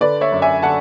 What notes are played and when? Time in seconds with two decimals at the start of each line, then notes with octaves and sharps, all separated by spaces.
0.01 D3 B4 D5
0.21 C#5 E5
0.32 F#2
0.42 E5 G#5
0.62 D3 F#5 A5